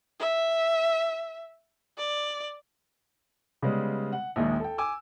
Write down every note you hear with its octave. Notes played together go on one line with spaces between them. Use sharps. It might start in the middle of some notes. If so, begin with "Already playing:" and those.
E5
D5
C#3 G3 G#3 B3
F#5
A#1 D#2 D#3 G#3
A4 G5
G#5 D6 E6